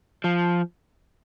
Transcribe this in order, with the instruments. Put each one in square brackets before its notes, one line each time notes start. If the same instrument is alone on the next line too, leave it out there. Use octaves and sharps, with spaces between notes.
[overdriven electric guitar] F3